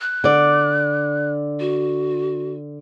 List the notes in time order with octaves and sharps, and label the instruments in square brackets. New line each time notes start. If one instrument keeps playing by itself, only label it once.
[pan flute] F#6
[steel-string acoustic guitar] D3 D5
[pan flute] F#4